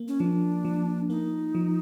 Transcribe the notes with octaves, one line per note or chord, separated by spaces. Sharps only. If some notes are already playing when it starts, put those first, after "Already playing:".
Already playing: A#3
C#4
F3 D4
F3
A#3 D#4
F3